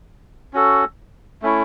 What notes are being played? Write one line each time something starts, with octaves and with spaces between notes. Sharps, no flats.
C#4 F#4 A4
A3 C#4 E4